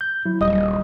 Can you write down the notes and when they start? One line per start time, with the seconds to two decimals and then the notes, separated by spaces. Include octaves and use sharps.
0.01 G6
0.25 F#3 E4
0.41 D#1 G3 D#5 D#6